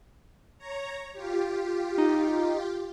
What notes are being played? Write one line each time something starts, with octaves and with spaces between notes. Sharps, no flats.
C#5 A#5
F4 G4
D#4